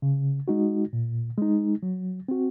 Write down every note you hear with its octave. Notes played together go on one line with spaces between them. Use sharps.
C#3
G#3 D#4 F#4
A#2
G#3 D#4
F#3
C4 F#4